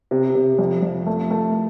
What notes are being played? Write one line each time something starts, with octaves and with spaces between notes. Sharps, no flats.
C3
C3
F2
F2
A3
A3